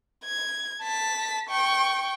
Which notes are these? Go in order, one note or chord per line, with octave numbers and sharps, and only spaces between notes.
G#6
A5 B6
G5 C#6